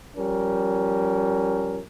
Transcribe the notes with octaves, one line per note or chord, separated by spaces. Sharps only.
F3 G3 C#4 A#4